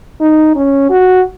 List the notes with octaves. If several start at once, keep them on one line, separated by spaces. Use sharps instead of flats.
D#4
C#4
F#4